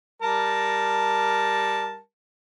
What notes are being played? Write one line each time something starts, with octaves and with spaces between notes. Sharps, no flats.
G3 A#4 A5